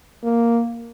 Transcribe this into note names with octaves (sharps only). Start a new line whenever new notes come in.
A#3